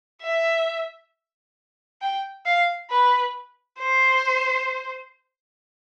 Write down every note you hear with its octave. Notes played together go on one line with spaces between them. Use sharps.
E5
G5
F5
B4
C5